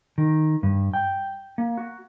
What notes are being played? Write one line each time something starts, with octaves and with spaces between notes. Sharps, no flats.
D#3
G2
G5
A#3
F#4